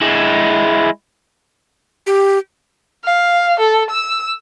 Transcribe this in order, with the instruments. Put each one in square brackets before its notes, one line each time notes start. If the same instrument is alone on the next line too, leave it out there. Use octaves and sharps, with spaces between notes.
[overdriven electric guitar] G#3 E4
[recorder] G4
[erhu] F5
A4
E6